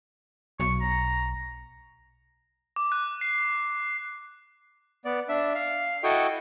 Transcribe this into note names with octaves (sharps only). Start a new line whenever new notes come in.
B1 C#6
A#5
D6
F#6
C7
B3 D5
D4 E5
F5
E4 F#4 A4 D#5 G5 C#6